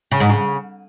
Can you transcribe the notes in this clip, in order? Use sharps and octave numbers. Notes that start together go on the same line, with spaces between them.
C#3
G#2
C#3